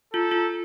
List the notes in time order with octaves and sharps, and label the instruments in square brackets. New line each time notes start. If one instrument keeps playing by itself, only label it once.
[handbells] F4 [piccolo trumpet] A4
[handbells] F4